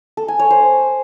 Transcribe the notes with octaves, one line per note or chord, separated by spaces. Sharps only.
A4
G#5
C#5
C5